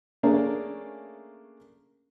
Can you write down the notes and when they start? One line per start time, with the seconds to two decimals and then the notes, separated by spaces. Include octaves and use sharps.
0.23 A3 A#3 C#4 D4 G#4 A#4